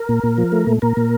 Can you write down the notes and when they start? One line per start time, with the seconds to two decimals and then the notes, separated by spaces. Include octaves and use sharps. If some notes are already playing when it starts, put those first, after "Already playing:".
Already playing: A#4
0.09 A#2
0.24 A#2
0.38 F3
0.52 A3
0.67 A#2
0.82 A#2 A#4
0.97 A#2